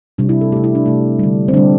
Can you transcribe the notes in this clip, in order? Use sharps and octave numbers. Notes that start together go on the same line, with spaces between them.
C3 G3 D4
E4
A4
C3 A3 G4
E4
D4
C3 A3
D3 G3
C4
D3 G3 D4